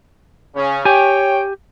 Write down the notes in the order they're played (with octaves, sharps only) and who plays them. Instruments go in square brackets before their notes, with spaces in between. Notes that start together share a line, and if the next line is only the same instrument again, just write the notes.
[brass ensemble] C#3 C#4
[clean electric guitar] G4 G#5 [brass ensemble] C#5 G5